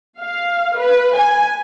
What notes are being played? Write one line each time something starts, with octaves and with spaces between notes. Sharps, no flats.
F5
B4
G#5